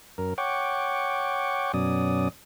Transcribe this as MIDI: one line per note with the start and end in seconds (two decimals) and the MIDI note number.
0.18 0.34 42
0.18 0.34 70
0.38 1.72 73
0.38 1.72 78
0.38 1.72 79
0.38 1.72 85
0.38 1.72 86
1.74 2.28 42
1.74 2.28 47
1.74 2.28 54
1.74 2.28 61
1.74 2.28 74
1.74 2.28 87